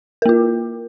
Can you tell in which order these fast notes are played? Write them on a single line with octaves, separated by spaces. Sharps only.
A#4 A#3 F4